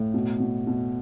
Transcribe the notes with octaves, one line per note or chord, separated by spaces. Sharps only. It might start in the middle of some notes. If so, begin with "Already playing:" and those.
Already playing: A2
B2
B2
B2